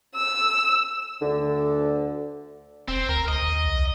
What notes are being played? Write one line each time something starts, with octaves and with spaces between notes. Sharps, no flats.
E6
D2 D3
F1 C4
D2 A#4
D2 D#5
D#2
C2